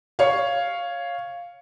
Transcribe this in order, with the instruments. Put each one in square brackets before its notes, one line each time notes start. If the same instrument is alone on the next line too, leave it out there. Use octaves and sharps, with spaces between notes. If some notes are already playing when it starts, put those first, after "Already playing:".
[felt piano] C#5 F5